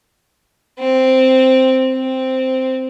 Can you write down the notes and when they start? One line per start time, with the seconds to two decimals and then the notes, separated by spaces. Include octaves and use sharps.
0.79 C4
1.92 C4